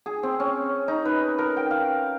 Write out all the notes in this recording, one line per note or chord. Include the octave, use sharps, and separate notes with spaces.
G#4
C4
C#4
D#4
B4
A#4
G5
F5